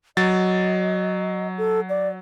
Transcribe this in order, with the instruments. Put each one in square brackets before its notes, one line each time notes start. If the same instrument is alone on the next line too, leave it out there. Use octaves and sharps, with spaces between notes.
[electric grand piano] F#3 A6 [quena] D#5
[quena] A4
D5